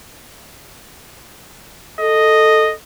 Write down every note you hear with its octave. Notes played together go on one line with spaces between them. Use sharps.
A4 D#5